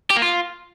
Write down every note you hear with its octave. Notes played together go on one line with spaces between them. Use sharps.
G4
A#3
F4